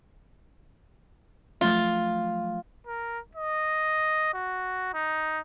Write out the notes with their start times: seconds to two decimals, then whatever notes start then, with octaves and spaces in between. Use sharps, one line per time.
1.61 F3 F#3 A3 F4
2.87 A#4
3.35 D#5
4.33 F#4
4.94 D#4